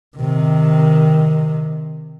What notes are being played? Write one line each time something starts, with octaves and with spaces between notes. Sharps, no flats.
C3 D#3